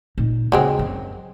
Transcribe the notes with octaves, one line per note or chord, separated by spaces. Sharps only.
A#2 D#4
D#2 C#3 F#3 G#3 C4
F#2